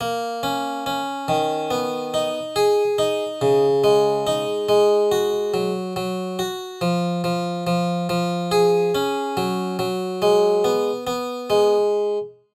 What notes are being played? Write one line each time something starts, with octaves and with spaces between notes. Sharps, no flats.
A#3
C#4
C#4
D#3
B3
D#4
G#4
D#4
C#3
G#3
D#4
G#3
F#4
F#3
F#3
F#4
F3
F3
F3
F3
G#4
C#4
F#3
F#3
G#3
B3
B3
G#3